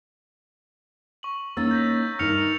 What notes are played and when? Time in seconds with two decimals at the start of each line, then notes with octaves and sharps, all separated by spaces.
1.23 C#6 F#7
1.57 A#3 C#4 D#4 E6 A6
1.71 G6 A#6 B6
2.19 G2 D#4 A#4 F6 C#7 F7